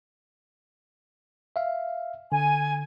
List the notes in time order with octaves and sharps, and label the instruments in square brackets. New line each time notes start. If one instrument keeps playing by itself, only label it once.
[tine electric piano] E5 F5
[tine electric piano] D3 [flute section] G#5